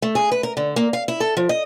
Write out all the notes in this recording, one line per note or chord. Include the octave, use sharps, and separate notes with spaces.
A3
G#4
B4
A#4
D3
A#3
F5
E4
A4
F3
D#5